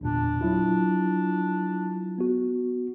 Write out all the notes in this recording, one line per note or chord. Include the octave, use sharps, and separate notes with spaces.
G1 E2 A#2 D4
F#3 E4 F4
B3 F#4